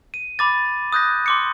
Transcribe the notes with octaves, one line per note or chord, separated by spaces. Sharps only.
D#7
B5 D6 A6
D#6 F#6 G6 A#6
C6 D6 C#7